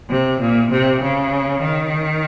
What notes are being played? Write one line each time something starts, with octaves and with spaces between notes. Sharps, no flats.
C3
A#2
C3
C#3
D#3